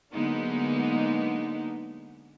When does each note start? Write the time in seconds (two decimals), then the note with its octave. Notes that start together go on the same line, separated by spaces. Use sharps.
0.13 D3 F#3 G#3 A#3 B3 D#4